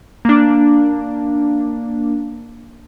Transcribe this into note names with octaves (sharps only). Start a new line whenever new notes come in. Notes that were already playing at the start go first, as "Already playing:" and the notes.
A#3 D4